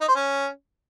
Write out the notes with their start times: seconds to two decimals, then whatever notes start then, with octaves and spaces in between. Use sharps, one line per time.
0.01 D#4
0.08 C5
0.15 C#4